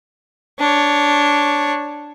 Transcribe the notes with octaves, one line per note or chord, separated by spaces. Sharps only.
D4 C#5